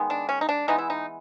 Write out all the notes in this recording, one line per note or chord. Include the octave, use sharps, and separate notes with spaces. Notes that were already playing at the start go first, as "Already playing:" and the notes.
Already playing: D#3 G#3 B3
D4
C#4
D#4
D4
E3 G#3 B3 D#4
E4
D#4